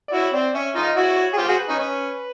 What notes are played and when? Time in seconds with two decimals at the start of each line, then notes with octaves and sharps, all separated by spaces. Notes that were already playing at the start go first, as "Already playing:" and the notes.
0.08 D5
0.13 E4 F#4 C#5
0.33 C4 D5
0.54 C#4 E5
0.75 D#4 F4 D#5
0.95 E4 F#4 C#5
1.16 C#5
1.33 G#4
1.37 F4 G4 C5
1.48 F#4 G#4
1.52 C5
1.59 B4
1.69 C#4 D#4
1.79 C#4